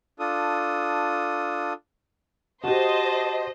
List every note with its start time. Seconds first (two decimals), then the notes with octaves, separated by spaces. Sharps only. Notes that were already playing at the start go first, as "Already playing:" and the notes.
0.19 D4 F4 A4 D#6
2.64 F#4 G4 C5 D#5 A5